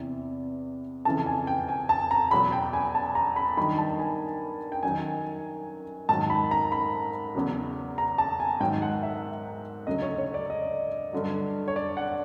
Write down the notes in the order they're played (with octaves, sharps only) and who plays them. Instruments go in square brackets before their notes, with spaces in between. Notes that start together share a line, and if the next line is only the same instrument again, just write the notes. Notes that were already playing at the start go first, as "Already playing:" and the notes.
Already playing: [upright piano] E2 C3 E3
F2 C#3 E3 A5
G#5
G5
G#5
A5
A#5
E2 B2 F#3 B5
G5
G#5
A5
A#5
B5
G2 D#3 F#3 B5
A5
G#5
G5
F#2 D#3 F#3 G#5
G#2 D#3 F#3 A5
B5
A#5
B5
E2 C#3 F#3
A#5
A5
G#5
G#2 D#3 F#3 G5
F#5
E5
D2 C#3 F#3 D#5
C#5
C#5
D5
D#5
G2 D3 F#3
C#5
D5
F#5